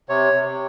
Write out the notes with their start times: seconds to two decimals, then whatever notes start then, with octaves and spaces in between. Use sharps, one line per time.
0.09 C3 C#5
0.34 C3